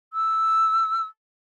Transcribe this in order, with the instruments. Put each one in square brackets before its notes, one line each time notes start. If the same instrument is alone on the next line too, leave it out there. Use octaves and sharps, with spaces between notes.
[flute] E6